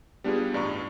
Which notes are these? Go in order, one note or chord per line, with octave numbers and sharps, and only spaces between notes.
G3 B3 D4 F4 G4 G#4
A1 G2 D5 A#5 C#6